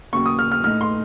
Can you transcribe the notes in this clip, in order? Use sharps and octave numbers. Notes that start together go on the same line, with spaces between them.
D#2 C#3 F#3 A#3 C#6
D#6
F6
F6
A2 A3 D#4 F6
C6